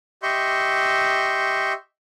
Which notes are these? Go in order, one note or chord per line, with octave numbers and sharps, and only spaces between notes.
G4 D#5 E5 C6 C#6 G6